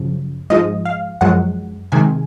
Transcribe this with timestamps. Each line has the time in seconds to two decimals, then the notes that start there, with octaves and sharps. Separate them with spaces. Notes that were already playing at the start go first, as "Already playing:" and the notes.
Already playing: F#2 C#3 F3
0.50 G#2 F3 G#3 D#5
0.85 F5
1.21 F#2 F3 G#3 F#5
1.92 C3 D#3 G#3 G#5